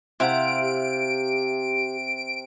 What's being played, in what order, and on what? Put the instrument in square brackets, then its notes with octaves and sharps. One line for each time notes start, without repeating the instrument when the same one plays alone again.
[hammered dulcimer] C3 [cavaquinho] E4 F5 F#5 [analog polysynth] D7
[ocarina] G4